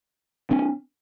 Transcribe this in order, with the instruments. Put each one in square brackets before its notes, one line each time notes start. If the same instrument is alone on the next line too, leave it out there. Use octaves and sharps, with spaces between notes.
[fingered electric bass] C4 D4